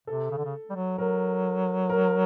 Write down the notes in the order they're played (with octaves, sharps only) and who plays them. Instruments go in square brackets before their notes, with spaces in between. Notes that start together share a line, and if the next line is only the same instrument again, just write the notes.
[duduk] C3 [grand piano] A4
[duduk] C#3
D3
C#3
G3
F#3
[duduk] F#3 [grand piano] A#4
[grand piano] A#4